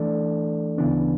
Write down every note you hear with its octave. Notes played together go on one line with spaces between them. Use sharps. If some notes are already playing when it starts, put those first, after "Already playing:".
Already playing: E3 A3 D4 A4 D5
D2 C#3 E3 B3 D4